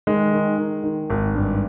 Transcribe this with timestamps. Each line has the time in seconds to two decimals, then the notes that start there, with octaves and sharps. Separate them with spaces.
0.07 D#3 G#3
0.33 D#3
0.58 D#3
0.84 D#3
1.10 G#1
1.35 G2